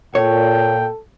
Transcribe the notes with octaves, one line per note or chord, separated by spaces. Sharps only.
A#2 A4 C#5 G5